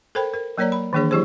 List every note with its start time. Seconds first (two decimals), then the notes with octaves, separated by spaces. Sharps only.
0.15 A4 A#4 C5 G5 B5
0.34 A#4
0.58 F#3 A#3 A#4 C#5 D5 A#5
0.72 B5
0.93 D#3 E3 A#3 D4 G#4 C#5
1.11 E3 F#3 E4 G4 G#4 C5